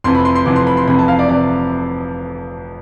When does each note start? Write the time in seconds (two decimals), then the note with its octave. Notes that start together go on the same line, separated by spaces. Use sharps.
0.04 F1 F2 C3 E3 C6
0.15 B5
0.25 C6
0.35 C6
0.46 F1 F2 C3 E3 D6
0.56 C6
0.67 B5
0.77 C6
0.88 F1 F2 C3 E3 B5
0.99 A5
1.08 F5
1.19 D5
1.29 C3 E3 D5